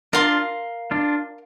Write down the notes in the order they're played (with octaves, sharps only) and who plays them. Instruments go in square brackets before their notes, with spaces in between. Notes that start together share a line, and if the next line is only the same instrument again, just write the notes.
[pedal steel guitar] D4 F4 [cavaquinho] A#4 F5 C6
[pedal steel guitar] D4 F4